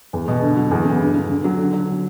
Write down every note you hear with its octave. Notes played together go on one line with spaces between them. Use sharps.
E2
B2
D3
F#3
E2
C#3
G2
D3
D3
F#3
D3
F#3